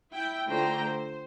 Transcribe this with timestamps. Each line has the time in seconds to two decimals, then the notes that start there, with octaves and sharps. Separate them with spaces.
0.12 E4 G5
0.49 D3 A3 F4 C5 G5 A#5
0.84 C5